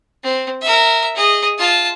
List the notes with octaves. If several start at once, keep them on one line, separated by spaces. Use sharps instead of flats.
C4
A#4 E5
G#4 D#5
F4 A5